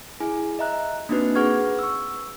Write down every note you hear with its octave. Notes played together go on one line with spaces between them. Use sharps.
E4 G#4 G#5
D#5 E5 A#5 F#6
A#3 C4 D4 D#4 F#4 B4
G#4 B4 F#5 C#6 F6 G#6
C#6 E6